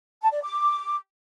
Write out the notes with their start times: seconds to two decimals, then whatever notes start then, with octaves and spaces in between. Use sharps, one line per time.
0.22 A5
0.32 D5
0.42 D6